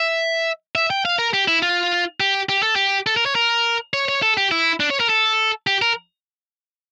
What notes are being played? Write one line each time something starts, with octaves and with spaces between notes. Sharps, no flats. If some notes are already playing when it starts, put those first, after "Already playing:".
Already playing: E5
E5
G5
F5
A#4
G4
E4
F4
G4
G4
A4
G4
A4
A#4
C#5
A#4
C#5
C#5
A4
G4
E4
D4
C#5
A#4
A4
G4
A#4